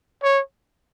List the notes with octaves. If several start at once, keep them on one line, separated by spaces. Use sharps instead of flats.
C#5